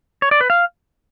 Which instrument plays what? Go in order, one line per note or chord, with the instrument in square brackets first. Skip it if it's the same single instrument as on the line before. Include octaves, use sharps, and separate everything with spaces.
[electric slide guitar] C#5
D5
B4
F5